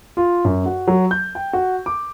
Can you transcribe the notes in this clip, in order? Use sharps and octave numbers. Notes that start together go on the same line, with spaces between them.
F4
F#2
F#4
F#3
G6
G5
F#4
D6